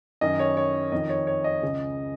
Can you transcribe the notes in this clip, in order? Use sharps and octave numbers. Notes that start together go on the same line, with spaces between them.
F#2 D#3 D#5
C#5
C#5
F2 D#3 D#5
C#5
C#5
D#5
C#2 C#3